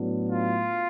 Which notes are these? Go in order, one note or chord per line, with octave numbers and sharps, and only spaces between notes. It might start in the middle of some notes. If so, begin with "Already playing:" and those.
Already playing: A2 F#3 B3 D4
F4